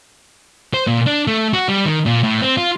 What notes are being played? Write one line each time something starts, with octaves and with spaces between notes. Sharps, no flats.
C5
A#2
D4
A3
F#4
G3
D#3
A#2
A2
C4
F4